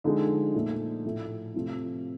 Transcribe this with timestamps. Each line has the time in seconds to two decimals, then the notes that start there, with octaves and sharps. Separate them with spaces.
0.04 D3 F3 G#3 D#4
0.55 A#2 F3 A3
1.05 A2 F3 A3
1.54 C3 F3 A3